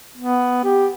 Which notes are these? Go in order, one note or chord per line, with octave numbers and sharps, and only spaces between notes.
B3
G4